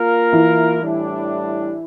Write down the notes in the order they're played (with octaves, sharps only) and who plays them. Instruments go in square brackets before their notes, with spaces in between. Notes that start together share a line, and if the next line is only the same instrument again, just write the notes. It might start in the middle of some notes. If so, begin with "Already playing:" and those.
Already playing: [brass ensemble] A#3 F4 A#4 F5
[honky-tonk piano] E3 E4
[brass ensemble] A2 G3 D4